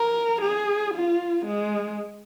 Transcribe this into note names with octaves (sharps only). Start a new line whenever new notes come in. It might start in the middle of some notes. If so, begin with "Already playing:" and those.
Already playing: A#4
G#4
F4
G#3